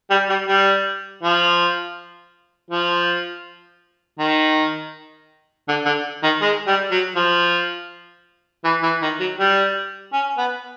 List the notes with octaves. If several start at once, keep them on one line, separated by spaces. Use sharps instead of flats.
G3
G3
G3
F3
F3
D#3
D3
D3
D#3
G#3
G3
F#3
F3
E3
E3
D#3
F#3
G3
C#4
B3